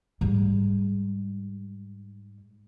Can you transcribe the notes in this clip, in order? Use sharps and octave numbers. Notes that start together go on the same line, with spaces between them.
G#2 G3